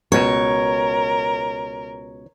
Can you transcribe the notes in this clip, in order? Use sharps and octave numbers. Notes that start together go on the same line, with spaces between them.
C#2 B2 A#4 C#5